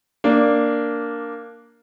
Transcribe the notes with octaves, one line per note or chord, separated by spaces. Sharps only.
A#3 D4